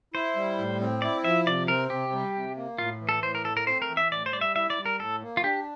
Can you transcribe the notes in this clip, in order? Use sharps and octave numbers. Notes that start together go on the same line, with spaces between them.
E4 C5
G3
A2
C4
E4 D5
F3 E5
C3 D5
C4 A#4
C3 G4
G3
C3
A#3
A2 F4
E3
A4
A2 C5
A#4
A3 A4
A#4
C4 C5
A#4
E3
E5
A2 D5
C5
G3 D5
E5
E4 E5
D5
G3
A#4
A2 A4
A#3
F4
D4 G4